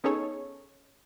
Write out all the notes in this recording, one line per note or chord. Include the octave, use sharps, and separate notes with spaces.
B3 C#4 D#4 G#4 A4 C#5